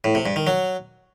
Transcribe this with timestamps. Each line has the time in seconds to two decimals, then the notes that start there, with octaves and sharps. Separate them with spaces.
0.04 A2
0.15 C3
0.26 G2
0.36 D#3
0.47 F#3